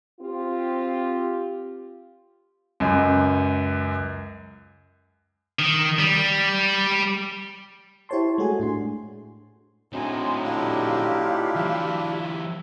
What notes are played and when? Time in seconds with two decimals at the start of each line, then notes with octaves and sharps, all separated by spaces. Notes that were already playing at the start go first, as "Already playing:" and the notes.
0.20 C4 F4 G4
2.80 C#2 F#2
5.59 D#3
5.99 G3
8.09 E4 G4 C5 C#5 A5 C6
8.38 G#3 A3 F#4 G#4 G#5
8.60 A2 D4 C6
9.93 A2 D3 F#3 C4 D#4 G#5 C6
10.44 D4 E4 F4 G4 F5
11.56 E3 F#3 E5